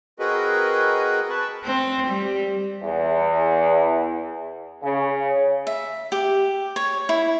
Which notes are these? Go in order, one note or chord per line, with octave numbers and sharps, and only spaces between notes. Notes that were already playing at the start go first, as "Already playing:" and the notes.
C4 F#4 G#4 A#4 B4 D#5
B4 A5 B5 C#6
C4
G3
E2
C#3
E5
G4
C#5
E4